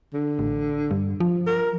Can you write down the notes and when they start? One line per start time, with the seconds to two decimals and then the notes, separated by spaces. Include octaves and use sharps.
0.14 D3
0.39 A1
0.91 G2
1.20 F3
1.47 A#4